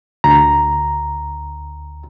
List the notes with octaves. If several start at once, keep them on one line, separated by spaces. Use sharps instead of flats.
D2 A#5